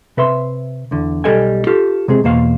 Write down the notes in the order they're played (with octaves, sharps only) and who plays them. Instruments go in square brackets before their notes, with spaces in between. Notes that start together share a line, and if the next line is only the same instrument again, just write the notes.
[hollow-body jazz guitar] C3 B4 E5 C6
E2 D3
B1 G3 A4 D#5 G5 G#5
F4 G4 A4
C3 G#3 C4 G#4
E2 B2 A#3 C5 F5